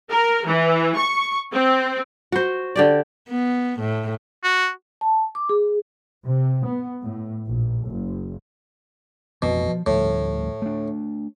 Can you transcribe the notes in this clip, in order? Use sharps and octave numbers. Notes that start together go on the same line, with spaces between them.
A#4
E3
C#6
C4
F#4 C5
D3 G4 D5
B3
A2
F#4
A5
D6
G#4
C3
B3
A2
A#1
F#1
A1 F2 B2 F3
F3
D2 A2 F3 G3
A3 D4